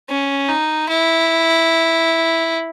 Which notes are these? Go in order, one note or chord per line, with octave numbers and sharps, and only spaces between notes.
C#4
D#4
E4